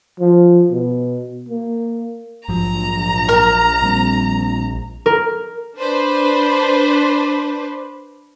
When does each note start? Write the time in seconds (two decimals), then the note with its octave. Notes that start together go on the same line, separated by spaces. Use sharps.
0.20 F3
0.71 B2
1.49 A#3
2.49 A#1 G#2 F3 F#3 A#5
3.29 A#4
3.82 A#2 G3 C4
5.06 A#4
5.79 D4 B4 C5